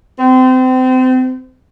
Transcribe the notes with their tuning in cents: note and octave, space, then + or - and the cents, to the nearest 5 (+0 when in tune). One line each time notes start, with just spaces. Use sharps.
C4 -30